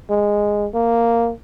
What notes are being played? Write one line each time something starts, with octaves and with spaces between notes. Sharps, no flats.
G#3
A#3